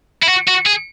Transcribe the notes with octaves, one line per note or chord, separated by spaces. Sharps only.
E4
F#4
F#4
G#4